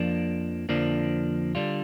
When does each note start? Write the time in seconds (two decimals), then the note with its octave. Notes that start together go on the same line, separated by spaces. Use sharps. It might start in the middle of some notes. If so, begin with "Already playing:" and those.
Already playing: F2 F3 A#3 D4
0.69 F2 D3 F3 A#3 D4
1.55 D3 G3 D4 F4